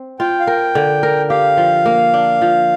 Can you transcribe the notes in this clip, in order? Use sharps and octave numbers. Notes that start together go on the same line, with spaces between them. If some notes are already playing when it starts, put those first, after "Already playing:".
Already playing: C4
F4 G5
F5
A#4 G5
D3
A#4
G4 F5
F3
A#3
D4
F3